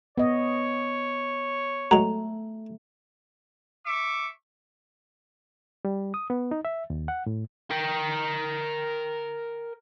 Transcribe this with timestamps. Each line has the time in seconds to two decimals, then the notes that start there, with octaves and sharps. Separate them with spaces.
0.18 B3 C#5 D#5
1.91 F#3 G#3 A3 A#5
3.85 E5 C#6 D6
5.85 G3
6.14 D#6
6.30 B3
6.51 D#4
6.65 E5
6.90 D#2
7.08 F#5
7.26 A2
7.71 A#4 G5